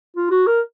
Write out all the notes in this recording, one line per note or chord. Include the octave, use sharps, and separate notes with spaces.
F4
F#4
A#4